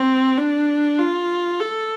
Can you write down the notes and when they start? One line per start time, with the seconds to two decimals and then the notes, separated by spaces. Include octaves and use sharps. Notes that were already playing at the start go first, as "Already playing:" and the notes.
Already playing: C4
0.38 D4
0.99 F4
1.60 A4